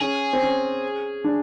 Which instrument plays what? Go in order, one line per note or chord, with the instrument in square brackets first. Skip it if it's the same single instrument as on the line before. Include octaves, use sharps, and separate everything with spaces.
[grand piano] C#4 [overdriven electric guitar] G#4
[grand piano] C4
C#4
D4